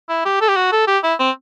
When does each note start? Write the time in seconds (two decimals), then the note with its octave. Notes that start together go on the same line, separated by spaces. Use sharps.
0.09 E4
0.25 G4
0.41 A4
0.48 G4
0.56 F#4
0.72 A4
0.87 G4
1.03 E4
1.19 C4